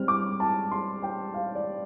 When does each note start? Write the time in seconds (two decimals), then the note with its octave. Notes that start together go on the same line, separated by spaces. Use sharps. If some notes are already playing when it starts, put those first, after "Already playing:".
Already playing: G3 C4 F6
0.08 D6
0.40 A5
0.71 C6
1.02 G5
1.34 F5
1.55 D5